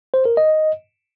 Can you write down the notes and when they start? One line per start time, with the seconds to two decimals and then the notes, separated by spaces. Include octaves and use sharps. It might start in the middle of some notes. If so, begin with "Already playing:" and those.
0.14 C5
0.25 A#4
0.37 D#5